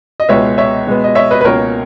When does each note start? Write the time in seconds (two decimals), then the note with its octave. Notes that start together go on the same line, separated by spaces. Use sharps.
0.20 D#5
0.29 C#2 B2 G#3 B3 C#5 E5
0.58 C#5 E5
0.87 B2 G#3 B3
1.04 D#5
1.15 C#5 E5
1.31 B4 D#5
1.41 B4
1.44 C#2 B2 A#3 C#4 A#4 C#5